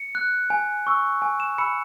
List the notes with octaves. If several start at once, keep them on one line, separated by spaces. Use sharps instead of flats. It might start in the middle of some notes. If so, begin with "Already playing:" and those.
Already playing: C#7
F#6
G#5
C#6 E6
G#5
E7
B5 E6 C#7